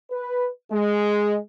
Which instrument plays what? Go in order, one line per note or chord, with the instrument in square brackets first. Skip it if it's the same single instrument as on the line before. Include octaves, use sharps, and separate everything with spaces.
[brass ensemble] B4
G#3